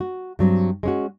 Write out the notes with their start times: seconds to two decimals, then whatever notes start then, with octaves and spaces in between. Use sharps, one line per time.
0.01 F#4
0.39 G2 F#3 C4
0.83 G#3 C#4 F#4